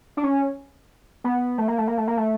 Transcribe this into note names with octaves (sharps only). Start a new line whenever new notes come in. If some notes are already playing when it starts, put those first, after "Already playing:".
D4
C#4
B3
A3
A#3
A3
A#3
A3
A#3
A3